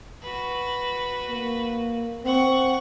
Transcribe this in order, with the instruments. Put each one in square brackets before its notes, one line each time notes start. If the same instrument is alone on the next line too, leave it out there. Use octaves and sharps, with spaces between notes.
[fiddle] F#4 B4
[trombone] A#3
[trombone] C4 [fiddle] F#5 C#6